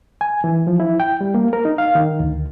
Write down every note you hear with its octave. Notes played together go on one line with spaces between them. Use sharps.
G#5
E3
F3
E4
G5
G3
A#3
A#4
D#4
F5
D#3
D2